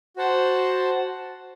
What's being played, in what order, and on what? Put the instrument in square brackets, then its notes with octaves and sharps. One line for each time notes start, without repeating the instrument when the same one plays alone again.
[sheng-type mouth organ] F#4 C5 F#5 A5